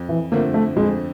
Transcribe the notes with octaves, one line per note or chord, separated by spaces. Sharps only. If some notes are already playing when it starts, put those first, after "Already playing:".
Already playing: F2
E3
D3 F3 A3 A#3 C4
A3
F2 G#3